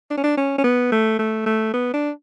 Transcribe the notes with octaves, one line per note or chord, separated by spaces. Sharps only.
D4
C#4
D4
C#4
C#4
B3
A3
A3
A3
B3
D4